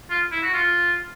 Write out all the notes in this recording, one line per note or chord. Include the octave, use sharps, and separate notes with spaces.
F4
E4
F#4
F4